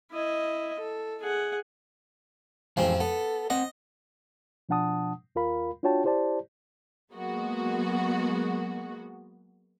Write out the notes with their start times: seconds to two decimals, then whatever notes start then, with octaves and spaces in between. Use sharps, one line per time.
0.11 E4 D#5
0.79 A4
1.22 G#4 F#5
2.77 A1 F2 E3 G#3 C4 G#4
3.01 B3 A4
3.50 C4 C5 D#5 F#5
4.69 B2 F3 D4 F#5 A5 D#6
5.35 D#2 F4 A#4 F5 B5
5.83 D4 F4 F#4 C#5 G5 A5
6.04 E4 G4 C5 D5 A5
7.12 F#3 G#3 A#3 B3 F#4